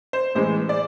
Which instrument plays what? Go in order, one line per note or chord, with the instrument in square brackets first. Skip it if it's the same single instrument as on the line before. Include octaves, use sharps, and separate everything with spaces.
[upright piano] C5
A2 E3 G#3 C5
D5